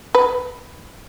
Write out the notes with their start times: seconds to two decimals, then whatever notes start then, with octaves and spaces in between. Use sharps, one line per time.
0.15 B4